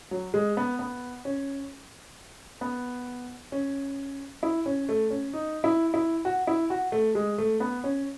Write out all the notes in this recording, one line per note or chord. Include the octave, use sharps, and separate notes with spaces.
F#3
G#3
B3
B3
C#4
B3
C#4
E4
C#4
A3
C#4
D#4
E4
E4
F#4
E4
F#4
A3
G#3
A3
B3
C#4